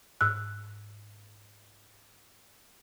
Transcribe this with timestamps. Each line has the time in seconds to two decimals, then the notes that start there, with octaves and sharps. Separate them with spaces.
0.21 G#2 E6 F#6